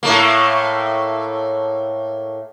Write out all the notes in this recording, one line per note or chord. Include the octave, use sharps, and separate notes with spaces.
A2 A3 A#3